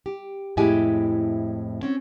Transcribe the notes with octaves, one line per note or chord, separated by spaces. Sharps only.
G4
F2 A2 G#3 E4 G4 G#5
C4 C#4